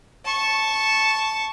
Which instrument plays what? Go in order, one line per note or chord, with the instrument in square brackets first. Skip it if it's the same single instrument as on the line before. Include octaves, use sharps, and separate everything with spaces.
[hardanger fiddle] A5 C#6